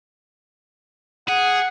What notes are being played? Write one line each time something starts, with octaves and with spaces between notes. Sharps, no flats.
G#4 F#5